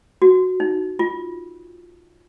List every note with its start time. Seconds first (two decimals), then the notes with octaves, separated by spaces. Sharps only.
0.22 F#4
0.60 D#4
0.99 F4